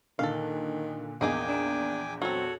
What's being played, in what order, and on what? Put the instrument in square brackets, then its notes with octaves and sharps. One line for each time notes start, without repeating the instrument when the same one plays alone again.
[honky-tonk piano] A#2 D3 [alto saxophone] D#3 [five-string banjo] A4 F5
[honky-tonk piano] A#1 E2 [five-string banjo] A#3 D#4 G#4 [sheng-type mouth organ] G5 G#5 D6
[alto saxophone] D4
[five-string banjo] F#3 C4 [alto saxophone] F#4 [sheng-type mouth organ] A4 C#5